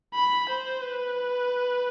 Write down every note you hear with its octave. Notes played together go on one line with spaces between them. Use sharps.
B5
C5
B4